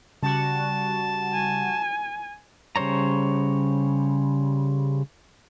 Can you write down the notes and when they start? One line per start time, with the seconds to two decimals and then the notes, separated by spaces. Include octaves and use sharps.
0.23 C#3 G3 F#4 A5
1.33 G#5
2.76 C#3 G3 C5 C#5 A#5